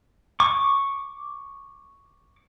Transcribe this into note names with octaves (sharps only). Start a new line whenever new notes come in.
C#6 D6